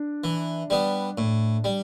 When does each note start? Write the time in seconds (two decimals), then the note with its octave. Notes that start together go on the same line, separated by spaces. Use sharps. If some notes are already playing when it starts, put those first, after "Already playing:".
Already playing: D4
0.24 E3
0.70 G3 B3
1.18 A2
1.64 G3